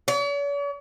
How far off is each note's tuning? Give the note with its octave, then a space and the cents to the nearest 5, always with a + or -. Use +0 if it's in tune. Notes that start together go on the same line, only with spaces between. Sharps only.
C#5 +45